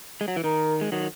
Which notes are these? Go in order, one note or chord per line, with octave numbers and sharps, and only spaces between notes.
G#3
F#3
E3
D#3 A#4
G#3
D#3 F#3